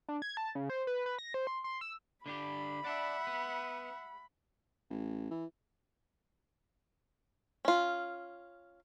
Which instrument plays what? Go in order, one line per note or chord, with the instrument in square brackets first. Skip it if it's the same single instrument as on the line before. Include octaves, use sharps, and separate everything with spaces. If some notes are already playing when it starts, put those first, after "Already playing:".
[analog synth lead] D4
G#6
A5
C#3
C5
B4
B4
A#6
C5
C6
C6
E6
[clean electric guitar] D3 D4 G4 [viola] B5
[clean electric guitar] D5 A5 [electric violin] E5 F#5
[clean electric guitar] B3
[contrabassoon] A1
E3
[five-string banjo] C#4 F4